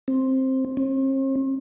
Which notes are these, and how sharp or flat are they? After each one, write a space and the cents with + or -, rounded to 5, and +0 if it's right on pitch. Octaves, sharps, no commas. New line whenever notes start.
C4 +10
C4 +45